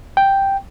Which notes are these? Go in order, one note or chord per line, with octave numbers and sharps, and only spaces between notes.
G5